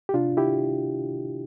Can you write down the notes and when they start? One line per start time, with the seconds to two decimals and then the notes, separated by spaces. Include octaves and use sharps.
0.09 G4
0.14 C3 D4 F4
0.37 E4 G4